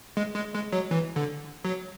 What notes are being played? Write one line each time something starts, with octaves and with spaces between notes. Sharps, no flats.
G#3
G#3
G#3
F#3
E3
D3
F#3